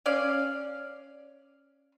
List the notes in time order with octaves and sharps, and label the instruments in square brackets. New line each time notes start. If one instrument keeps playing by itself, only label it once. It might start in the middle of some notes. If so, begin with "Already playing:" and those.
[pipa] C#4 D5 F5